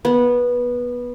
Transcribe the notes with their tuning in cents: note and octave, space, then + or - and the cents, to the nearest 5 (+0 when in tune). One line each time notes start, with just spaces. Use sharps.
B3 -15